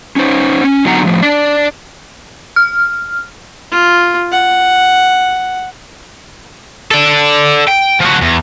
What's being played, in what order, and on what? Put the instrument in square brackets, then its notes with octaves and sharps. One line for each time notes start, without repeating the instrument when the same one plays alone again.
[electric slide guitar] C#4 D#4 C5
C#4
D3 F#3 B3 D#4 F#5 A#5
A2 F3
D4 D5
[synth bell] F6
[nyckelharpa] F4
F#5
[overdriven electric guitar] A4 D5
G5
F3 F#4
E2